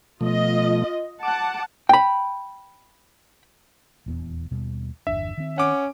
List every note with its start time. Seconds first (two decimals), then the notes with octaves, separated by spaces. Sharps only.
0.21 B2 F3 A3 F4 D#5
1.23 F#5 A5 D6
1.89 G5 B5
4.06 D#1 E2 B3
4.51 D#2 B2 G3
5.07 G1 E2 D4 E5
5.38 D#3 C4
5.58 C#4 F#5 D6